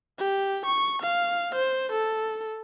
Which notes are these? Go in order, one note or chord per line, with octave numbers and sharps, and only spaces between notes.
G4
C#6
F5
C5
A4